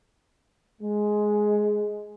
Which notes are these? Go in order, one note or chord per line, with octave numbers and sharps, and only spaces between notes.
G#3